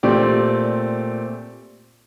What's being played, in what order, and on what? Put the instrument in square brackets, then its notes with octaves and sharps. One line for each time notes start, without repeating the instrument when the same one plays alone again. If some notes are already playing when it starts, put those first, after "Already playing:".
[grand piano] A#2 A3 C4 G4 D5